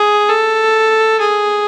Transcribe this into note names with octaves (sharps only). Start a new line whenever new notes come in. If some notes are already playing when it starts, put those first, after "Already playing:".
Already playing: G#4
A4
G#4